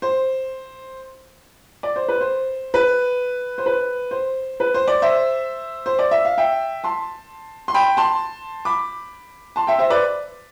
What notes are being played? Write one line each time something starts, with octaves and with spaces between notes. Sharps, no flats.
C5
D5
C5
B4
C5
B4
C5
B4
C5
B4
C5
D5
C5 E5
C5
D5
E5
F5
E5 G5
A5 C6
C6
G5 B5
A5 C6
B5 D6
A5 C6
E5 G5
C5 E5
B4 D5